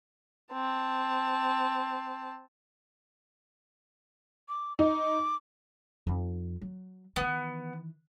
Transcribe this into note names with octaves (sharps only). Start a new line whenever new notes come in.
C4 A5
D6
D#4 D6
F2 D#4
F#3
D#3 E3 B3